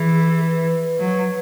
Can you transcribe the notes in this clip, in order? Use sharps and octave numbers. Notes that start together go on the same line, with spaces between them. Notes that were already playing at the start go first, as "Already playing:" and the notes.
Already playing: E3 G#4
G#4
B4
F#3